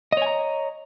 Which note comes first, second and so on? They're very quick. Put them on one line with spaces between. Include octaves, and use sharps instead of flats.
D#5 C#5 G#5 A#5